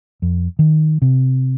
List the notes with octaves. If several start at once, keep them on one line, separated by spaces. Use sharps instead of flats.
F2
D#3
C3